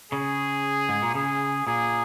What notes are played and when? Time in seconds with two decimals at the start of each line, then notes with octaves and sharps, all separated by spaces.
0.12 C#3 G#4
0.89 G#2
1.02 A#2
1.15 C#3 G#4
1.66 A#2 G#4